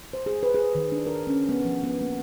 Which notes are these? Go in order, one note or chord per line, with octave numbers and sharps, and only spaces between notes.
C5
G#4
B4
G#4
D#3
D4
A#4
C#4
B3
F3
B3
A#3